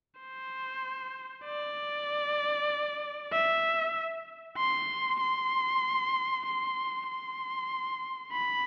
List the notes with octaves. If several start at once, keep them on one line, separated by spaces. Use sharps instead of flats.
C5
D5
E5
C6
C6
C6
C6
B5